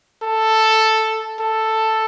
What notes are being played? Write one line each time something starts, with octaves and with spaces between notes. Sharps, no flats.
A4
A4